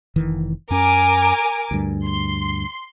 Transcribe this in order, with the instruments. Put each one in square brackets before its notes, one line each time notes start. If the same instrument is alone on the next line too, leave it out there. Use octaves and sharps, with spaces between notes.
[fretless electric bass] F1 D#3 E3
[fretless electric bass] F#2 C#4 [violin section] A#4 G#5 D6
[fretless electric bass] D2 G2
[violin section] C6